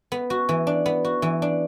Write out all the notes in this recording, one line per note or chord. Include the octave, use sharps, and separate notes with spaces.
B3
F#4
E3
D4
B3
F#4
E3
D4